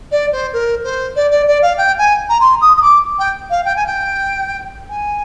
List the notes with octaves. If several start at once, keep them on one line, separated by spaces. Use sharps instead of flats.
D5
C5
A#4
C5
D5
D5
D5
F5
G5
G#5
A#5
C6
D#6
D#6
D6
G5
F5
G5
G#5
G5
G#5